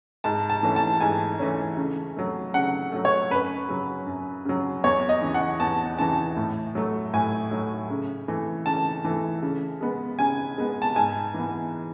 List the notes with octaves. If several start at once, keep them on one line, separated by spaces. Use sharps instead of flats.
G#2 A5
A5
E3 A3 C#4
A5
G#2 G#5
E3 A3 C#4
C#3
F#3 A3
C#3 F#5
F#3 A3
C#5
F#2 B4
C#3 F#3
F#2
C#3 F#3
E2 C#5
D#5
C#3 E3
F#5
E2 A5
C#3 E3 A5
A2
F#3 A3
A2 G#5
F#3 A3
C#3
E3 A3
C#3 A5
E3 A3
C#3
G#3 B3
C#3 G#5
G#3 B3
A5
G#2 G#5
E3 B3